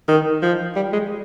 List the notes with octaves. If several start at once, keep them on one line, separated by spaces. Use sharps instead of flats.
D#3
F3
G3
G#3